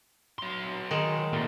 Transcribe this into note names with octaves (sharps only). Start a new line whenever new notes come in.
F#3 C6
D#3 G#3
A#2 A3